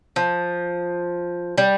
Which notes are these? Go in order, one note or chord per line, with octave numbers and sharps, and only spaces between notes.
F3
G3